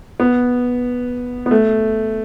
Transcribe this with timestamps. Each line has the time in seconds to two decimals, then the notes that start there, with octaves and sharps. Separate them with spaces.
0.20 B3
1.46 B3
1.51 A3